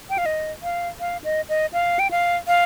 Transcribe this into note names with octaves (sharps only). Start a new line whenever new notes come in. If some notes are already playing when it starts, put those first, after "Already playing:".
G5
F5
D#5
F5
F5
D#5
D#5
F5
G5
F5
F5